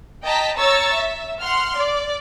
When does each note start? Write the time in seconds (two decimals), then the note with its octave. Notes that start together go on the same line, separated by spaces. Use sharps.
0.24 D#5 G5 A5 A#5 B6
0.58 C#5 A#5 C#6 E6 A6
0.96 E5
1.41 F#5 C6 F6
1.77 D5